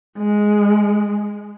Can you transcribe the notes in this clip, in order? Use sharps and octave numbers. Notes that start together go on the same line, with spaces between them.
G#3